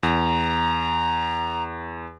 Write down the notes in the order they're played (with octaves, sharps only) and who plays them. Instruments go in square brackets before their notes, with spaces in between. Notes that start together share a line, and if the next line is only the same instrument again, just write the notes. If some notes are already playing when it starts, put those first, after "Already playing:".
[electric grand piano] E2 [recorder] A#5